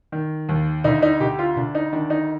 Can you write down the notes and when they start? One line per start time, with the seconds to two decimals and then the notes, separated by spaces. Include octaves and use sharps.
0.12 D#3
0.49 D#2
0.84 D2 D#4
1.02 D#4
1.20 D2 G4
1.39 F4
1.56 D2 D4
1.75 D#4
1.93 D#3 D4
2.10 D#4